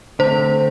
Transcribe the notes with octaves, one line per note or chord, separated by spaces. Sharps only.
D3 A3 C4 C5